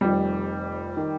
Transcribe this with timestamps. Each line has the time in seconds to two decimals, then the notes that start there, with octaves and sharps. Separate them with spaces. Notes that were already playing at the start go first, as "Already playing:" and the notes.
0.01 F1 F2 D#3 G3
0.97 D#3